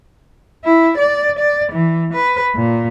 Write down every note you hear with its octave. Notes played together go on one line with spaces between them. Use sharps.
E4
D5
D5
E3
B4
A#2